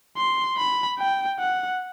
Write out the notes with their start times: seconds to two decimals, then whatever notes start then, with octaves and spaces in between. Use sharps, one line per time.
0.17 C6
0.57 B5
0.99 G5
1.39 F#5